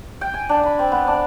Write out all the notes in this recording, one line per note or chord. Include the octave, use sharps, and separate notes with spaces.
G5
G#5
D4
B5
C4
B3
D4